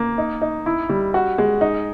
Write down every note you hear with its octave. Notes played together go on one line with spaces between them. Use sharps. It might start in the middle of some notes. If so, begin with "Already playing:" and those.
Already playing: A#3
D#4
D#4
E4
G3
F#4
G#3
D#4